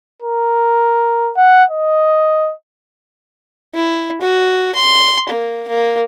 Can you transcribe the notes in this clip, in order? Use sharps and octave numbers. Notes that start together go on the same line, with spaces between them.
A#4
F#5
D#5
E4
F#4
C6
A#3
A#3